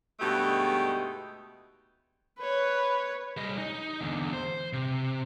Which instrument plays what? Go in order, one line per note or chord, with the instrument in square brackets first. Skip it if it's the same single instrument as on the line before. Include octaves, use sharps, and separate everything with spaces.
[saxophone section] G2 B2 G#3 A3 D#4 G4
[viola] B4 C#5
[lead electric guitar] G3 D#5
D#4
E2 D3
C5
C3